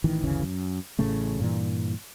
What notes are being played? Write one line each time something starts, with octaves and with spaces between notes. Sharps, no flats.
A1 D#3 E3
G1 D2 C#3 E3
F#2
A1 A2 C#3 A3
G2 A#2 E3